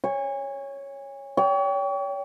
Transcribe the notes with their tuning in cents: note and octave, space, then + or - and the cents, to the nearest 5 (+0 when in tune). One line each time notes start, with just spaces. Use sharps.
C#5 +0 G#5 -35
C#5 +35 G5 +0